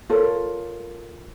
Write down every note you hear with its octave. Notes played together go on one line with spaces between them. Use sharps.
F4 A4 A#4 C#5